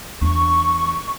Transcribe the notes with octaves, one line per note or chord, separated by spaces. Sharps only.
E2 D4 C#6